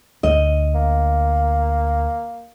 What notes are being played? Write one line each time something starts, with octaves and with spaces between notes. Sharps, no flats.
D2 D#5
A#3